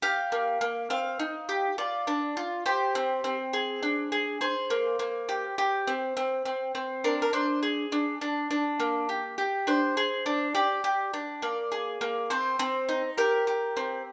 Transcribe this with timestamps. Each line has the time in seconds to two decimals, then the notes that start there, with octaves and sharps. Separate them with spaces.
0.02 G4 F5
0.32 A#3
0.61 A#3
0.90 C4 F5
1.19 D#4
1.49 G4
1.78 F4 D5
2.07 D4
2.37 F4
2.66 G4 C5
2.95 C4
3.24 C4
3.53 G#4
3.83 D4
4.12 G#4
4.41 G#4 C5
4.70 A#3
4.99 A#3
5.29 G4
5.58 G4
5.87 C4
6.17 C4
6.45 C4
6.75 C4
7.04 D4 A#4
7.22 A#4
7.33 D4 C5
7.63 G#4
7.92 D4
8.21 D4
8.51 D4
8.80 A#3
9.09 G4
9.38 G4
9.67 D4 C5
9.97 G#4
10.26 D4
10.55 G4 D5
10.84 G4
11.14 D4
11.42 A#3 D5
11.72 G#4
12.01 A#3
12.30 C4 C5
12.59 C4
12.89 D#4
13.17 G4 A#4
13.47 G4
13.77 C4